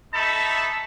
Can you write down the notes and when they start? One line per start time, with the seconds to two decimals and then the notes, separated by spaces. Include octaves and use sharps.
0.14 D#4 A4 E5 A5 B5 C#6